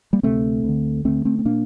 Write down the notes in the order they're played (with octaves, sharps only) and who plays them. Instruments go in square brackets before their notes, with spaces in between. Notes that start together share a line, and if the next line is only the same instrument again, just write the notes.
[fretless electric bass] G3 A#3
D2 C3 A3 C4
D2
D3
D2 D3 A3 C4
A3 C4
C4
A#2 A#3 D4